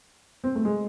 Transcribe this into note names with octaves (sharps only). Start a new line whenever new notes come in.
C4
A3
G#3